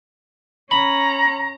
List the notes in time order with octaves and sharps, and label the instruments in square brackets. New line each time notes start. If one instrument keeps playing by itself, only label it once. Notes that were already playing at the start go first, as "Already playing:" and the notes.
[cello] C#4 [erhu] A#5 [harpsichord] B5